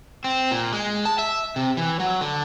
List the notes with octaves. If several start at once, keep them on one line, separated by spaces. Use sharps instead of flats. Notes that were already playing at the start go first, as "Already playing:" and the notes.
C4
A#2
G#3
A5
E5
C3
E3
F#3
D3